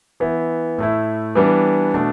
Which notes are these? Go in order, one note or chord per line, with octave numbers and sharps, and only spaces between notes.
E3 B3 E4
A2 A3 E4
E3 G3 B3 D4
B2 A3 D4